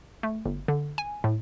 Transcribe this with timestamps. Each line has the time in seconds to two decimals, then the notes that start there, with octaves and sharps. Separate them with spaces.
0.23 A3
0.46 G1
0.68 D3
0.98 G#5
1.24 A2